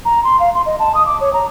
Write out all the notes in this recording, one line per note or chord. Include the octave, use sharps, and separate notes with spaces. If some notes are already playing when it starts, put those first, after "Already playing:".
A#5
C6
F5
C6
D#5
A5
D#6
D6
C#5
A#5